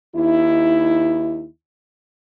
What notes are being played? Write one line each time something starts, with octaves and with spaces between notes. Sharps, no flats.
D#2 D#4 E4